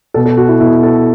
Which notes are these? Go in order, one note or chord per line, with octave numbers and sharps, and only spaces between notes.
B2 A4
A4
F#4
E4
B2 E4
A4